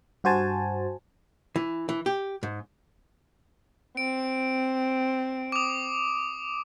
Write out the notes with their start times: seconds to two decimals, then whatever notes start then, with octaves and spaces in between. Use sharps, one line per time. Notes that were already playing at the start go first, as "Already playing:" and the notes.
0.24 G2 F#4 C5 G#5 A5
1.56 E3
1.89 E3
2.06 G4
2.43 G#2
3.97 C4 D7
5.52 D6 D#6